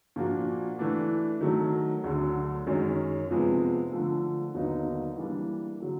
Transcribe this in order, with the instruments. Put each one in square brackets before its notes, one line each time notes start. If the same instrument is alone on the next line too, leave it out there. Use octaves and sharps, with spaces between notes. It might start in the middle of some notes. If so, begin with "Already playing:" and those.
[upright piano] A#2 F3 A#3 D4 F#4
E3 A3 D4
D#3 F#3 A3
D2 D3 F#3
F#2 D#3 G#3 C#4
F2 C3 F3 G#3 B3
D3 F3 A3
D#2 D3 F#3 B3 D#4
E3 G3 A#3 D4
D3 F#3